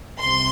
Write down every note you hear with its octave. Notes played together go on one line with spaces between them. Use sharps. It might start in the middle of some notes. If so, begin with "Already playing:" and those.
C2 C3 C6